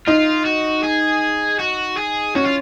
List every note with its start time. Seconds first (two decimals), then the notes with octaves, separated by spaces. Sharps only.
0.07 D#4 F4
0.46 F#4
0.84 G#4
1.60 F#4
1.97 G#4
2.35 C#4 F#4
2.45 F4